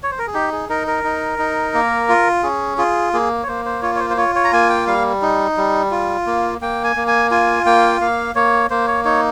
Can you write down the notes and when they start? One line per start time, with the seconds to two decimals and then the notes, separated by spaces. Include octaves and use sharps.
0.03 C#5
0.11 C5
0.19 A#4
0.27 G#4
0.34 D#4 G4
0.52 G#4
0.69 D#4 A#4
0.87 A#4
1.04 D#4
1.39 D#4
1.74 A#3
2.09 F4
2.43 C#4 G#4
2.78 F4 G#4
3.13 A#3 G#4
3.43 C#5
3.47 A#3 C5
3.65 C5
3.82 F4 C#5
3.95 C#5
3.99 C5
4.10 C5
4.17 F4 C#5
4.35 C#5
4.44 A#5
4.52 A#3 G#5
4.69 G5
4.87 G3 F5
5.22 D#4
5.57 G3
5.91 F4
6.27 A#3
6.61 A#3 G5
6.84 G#5
6.96 A#3
7.07 G#5
7.31 F4 G#5
7.66 A#3 G5
8.01 A#3 F5
8.35 A#3 C#5
8.70 A#3 C5
8.87 C#5
9.05 D#4 C#5